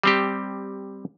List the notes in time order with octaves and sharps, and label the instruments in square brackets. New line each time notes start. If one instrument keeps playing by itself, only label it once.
[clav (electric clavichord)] G3 C4 G4